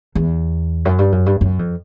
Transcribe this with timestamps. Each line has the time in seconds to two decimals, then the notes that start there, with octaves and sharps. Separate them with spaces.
0.15 E2
0.85 F#2
0.99 G2
1.12 F#2
1.26 G2
1.41 F#2
1.59 F2